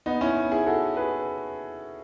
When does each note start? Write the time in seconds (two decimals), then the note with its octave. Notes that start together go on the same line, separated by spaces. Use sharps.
0.06 B3 D#4
0.21 C#4 E4
0.52 E4 G#4
0.66 F#4 A4
0.97 G#4 B4